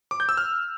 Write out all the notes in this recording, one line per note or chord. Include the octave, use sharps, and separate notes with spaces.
D6
G6
E6
F6